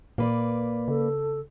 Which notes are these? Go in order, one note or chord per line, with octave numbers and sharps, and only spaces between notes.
A#2 A#3 B4 D5
C#3 A4